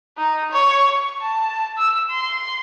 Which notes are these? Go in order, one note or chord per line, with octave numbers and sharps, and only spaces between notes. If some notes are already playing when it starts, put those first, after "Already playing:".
D#4
C#5
C#6
A5
E6
C6